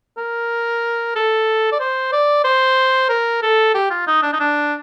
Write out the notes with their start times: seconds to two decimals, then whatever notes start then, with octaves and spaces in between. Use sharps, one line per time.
0.18 A#4
1.16 A4
1.72 D5
1.80 C5
2.13 D5
2.44 C5
3.09 A#4
3.42 A4
3.74 G4
3.90 F4
4.07 D#4
4.23 D4
4.33 D#4
4.40 D4